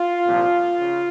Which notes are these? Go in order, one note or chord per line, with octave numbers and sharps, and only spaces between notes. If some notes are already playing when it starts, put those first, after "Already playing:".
Already playing: F4
C2 A#2 F3
C#3